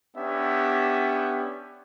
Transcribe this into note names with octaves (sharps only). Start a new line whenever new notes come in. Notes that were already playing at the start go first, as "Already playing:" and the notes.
B3 C#4 D4 G4 E5